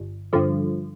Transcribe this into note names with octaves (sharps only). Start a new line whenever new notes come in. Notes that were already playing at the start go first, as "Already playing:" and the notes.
Already playing: G1
G2 D3 F3